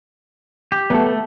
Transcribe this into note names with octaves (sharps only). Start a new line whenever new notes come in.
G4
F#3 A3 B3 A4
A3